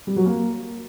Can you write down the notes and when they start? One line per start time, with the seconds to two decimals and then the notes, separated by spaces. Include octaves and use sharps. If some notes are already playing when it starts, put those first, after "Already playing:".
0.07 G3
0.16 F#3
0.26 A#3